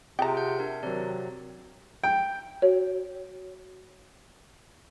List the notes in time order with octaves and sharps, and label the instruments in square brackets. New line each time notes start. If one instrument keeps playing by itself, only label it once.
[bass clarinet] C3 [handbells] C4 F4 G#4 [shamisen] G5 A#5
[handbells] F#5 G6
D4 A#4
[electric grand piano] C3 F#3 [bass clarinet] D#3 [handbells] D5
[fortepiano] G5
[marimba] F#4 C#5